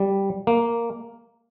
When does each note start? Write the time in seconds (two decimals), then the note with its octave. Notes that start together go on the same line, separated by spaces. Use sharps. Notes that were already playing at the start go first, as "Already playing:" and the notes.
Already playing: G3
0.47 A#3